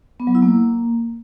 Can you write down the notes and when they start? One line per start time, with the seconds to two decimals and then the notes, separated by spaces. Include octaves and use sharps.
0.20 B3
0.27 F#3
0.35 E4
0.42 A#3